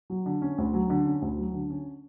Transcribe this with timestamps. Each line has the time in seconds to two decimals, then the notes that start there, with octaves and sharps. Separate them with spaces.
0.10 F#3
0.26 D3
0.42 C#4
0.58 D2
0.74 F#3
0.90 D3
1.06 C#4
1.22 D2
1.38 F#3
1.54 D3
1.70 C#4